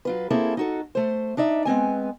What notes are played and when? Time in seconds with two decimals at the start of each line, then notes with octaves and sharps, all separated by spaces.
0.05 F#3 F4 B4
0.30 A#3 C4 E4 G#4 A4
0.57 D#4 F#4 A4
0.95 A3 C5
1.37 D4 D#4 D5 E5
1.65 G#3 B3 C4 G#5